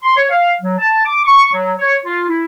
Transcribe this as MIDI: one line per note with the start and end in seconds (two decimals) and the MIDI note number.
0.03 0.16 84
0.17 0.27 73
0.30 0.54 77
0.62 0.77 54
0.78 1.02 81
1.05 1.20 86
1.25 1.50 85
1.53 1.72 54
1.78 1.97 73
2.05 2.25 65
2.28 2.45 64